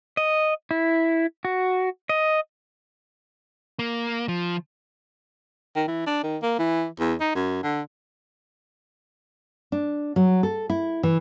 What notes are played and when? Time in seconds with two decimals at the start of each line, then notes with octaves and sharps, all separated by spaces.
0.17 D#5
0.71 E4
1.45 F#4
2.09 D#5
3.79 A#3
4.28 F3
5.76 D#3
5.88 E3
6.07 D4
6.24 D#3
6.42 A#3
6.59 E3
6.99 E2
7.21 D#4
7.35 F#2
7.64 D3
9.72 D4
10.16 F#3
10.43 A4
10.70 E4
11.03 E3